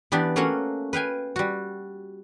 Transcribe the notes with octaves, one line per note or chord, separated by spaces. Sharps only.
E3 B3 D4 G4
A3 A#3 C#4 F#4 F5 F#5
B4 F5 G5 G#5
G3 F#4